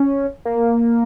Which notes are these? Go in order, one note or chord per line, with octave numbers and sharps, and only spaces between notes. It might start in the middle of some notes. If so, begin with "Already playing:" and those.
Already playing: C#4
A#3